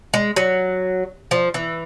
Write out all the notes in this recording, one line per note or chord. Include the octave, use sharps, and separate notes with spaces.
G#3
F#3
F3
E3